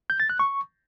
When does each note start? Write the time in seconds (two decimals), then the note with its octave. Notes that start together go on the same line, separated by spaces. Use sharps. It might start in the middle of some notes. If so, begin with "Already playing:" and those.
0.10 G6
0.20 A6
0.30 F#6
0.39 C#6